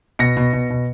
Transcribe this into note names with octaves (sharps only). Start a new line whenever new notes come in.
B2 A#6 C#7
B2
B2
B2